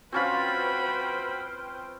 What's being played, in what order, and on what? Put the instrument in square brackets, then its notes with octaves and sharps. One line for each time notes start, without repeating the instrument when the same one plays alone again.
[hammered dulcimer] C4 C#4 F4 [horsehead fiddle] F#4 B5 [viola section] B4 C5 G5